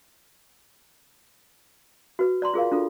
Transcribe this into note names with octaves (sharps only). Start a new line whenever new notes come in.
F#4 B4
D5 A#5 C6
F4 G#4 A#4 F5
D4 F4 A4